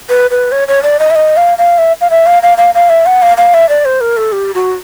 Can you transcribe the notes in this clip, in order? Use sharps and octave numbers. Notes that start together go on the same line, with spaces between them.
B4
B4
C#5
C#5
D5
D#5
E5
D#5
F5
F5
E5
F5
E5
F5
F5
F5
F5
E5
F#5
F5
F5
E5
D5
C5
A#4
A4
G4
F#4